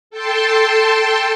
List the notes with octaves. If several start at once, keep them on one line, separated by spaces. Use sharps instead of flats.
A4 G5 A5 C6